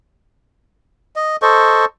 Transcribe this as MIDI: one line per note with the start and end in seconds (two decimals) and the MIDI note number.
1.16 1.36 75
1.42 1.85 69
1.42 1.85 72
1.42 1.85 75
1.42 1.85 85